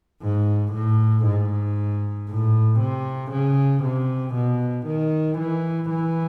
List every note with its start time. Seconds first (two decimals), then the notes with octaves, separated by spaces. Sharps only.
0.22 G#2
0.73 A2
1.25 G#2
2.29 A2
2.80 C3
3.32 C#3
3.83 C3
4.35 B2
4.86 D#3
5.38 E3
5.90 E3